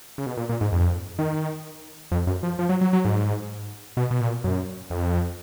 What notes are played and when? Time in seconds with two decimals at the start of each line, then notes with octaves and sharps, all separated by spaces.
0.18 C#3
0.26 B2
0.37 A#2
0.49 A#2
0.61 G#2
0.72 F2
1.19 D#3
2.12 F2
2.27 F#2
2.43 F3
2.59 F3
2.69 F#3
2.81 F#3
2.93 F#3
3.05 G#2
3.97 B2
4.11 B2
4.21 A#2
4.44 F#2
4.90 F2